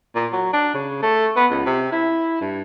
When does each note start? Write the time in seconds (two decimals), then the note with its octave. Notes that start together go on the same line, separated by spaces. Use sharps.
0.15 A#2
0.33 F#3
0.53 D4
0.74 C#3
1.02 A3
1.36 B3
1.51 C#2
1.66 C3
1.92 E4
2.41 G2